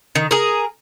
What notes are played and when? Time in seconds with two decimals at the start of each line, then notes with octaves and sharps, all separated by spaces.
0.15 D#3
0.31 G#4 A#4